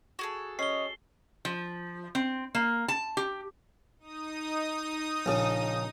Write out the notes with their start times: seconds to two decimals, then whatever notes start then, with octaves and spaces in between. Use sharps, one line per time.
0.19 F#4 G#4 A4
0.59 C#4 D#5 C7 G7
1.45 F3
2.15 C4
2.55 A#3
2.88 A5
3.17 G4
3.99 D#4 D#6
5.26 A#1 C#3